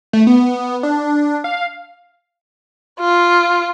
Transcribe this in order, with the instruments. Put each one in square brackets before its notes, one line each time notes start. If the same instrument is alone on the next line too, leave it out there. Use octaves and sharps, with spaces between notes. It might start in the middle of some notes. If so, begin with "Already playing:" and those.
[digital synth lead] A3
B3
D4
F5
[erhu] F4